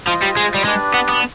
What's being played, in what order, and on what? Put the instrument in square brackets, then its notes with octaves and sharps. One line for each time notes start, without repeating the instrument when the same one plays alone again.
[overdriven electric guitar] F3 [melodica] F4 C5 D#5
[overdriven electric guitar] G3
G#3
G3
[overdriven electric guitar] G#3 [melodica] D4 G4 B4 D5
[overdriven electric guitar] B3
B3